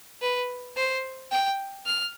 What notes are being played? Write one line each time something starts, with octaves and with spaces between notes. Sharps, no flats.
B4
C5
G5
F6